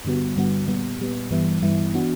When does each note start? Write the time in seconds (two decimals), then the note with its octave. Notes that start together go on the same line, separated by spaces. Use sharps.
0.05 G2 D3 G3 B3 F#4
0.36 G2 D3 G3 B3 F#4
0.68 A#2 G3 B3
0.99 A#2 G3 B3
1.31 G2 E3 G3 B3 E4
1.62 G2 E3 G3 B3 E4
1.93 E3 B3 D4 F#4